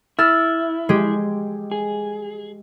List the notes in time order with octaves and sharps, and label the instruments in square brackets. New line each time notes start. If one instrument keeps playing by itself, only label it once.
[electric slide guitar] E4 [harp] E6 F6 A6
[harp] G#3 G4
[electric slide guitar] G#4